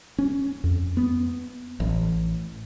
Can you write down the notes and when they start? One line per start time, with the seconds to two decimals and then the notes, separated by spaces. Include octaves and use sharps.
0.18 C#4
0.64 F2
0.97 B3
1.80 A1